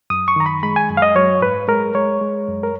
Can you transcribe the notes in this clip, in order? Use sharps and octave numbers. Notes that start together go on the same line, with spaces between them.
F#2 D#6
C#6
D#3 A#5
B5
G#3 B5
G#5
F#2
F5
D#5
F#3 C#5
G#2 B4
G#3 A#4
G#3 C#5
G#3
F#2
A#4